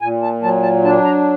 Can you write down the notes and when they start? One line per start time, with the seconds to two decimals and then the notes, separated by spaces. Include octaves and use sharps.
0.02 A#2 G#5
0.22 A5
0.42 F#3 A5
0.63 A5
0.84 D4 A5
1.05 A#5